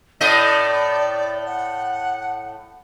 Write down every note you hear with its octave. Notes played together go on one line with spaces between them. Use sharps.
A2 A3 D5 D#5
F#5